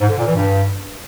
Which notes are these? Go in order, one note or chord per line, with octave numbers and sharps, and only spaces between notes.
G#2
D3
A#2
E3
G2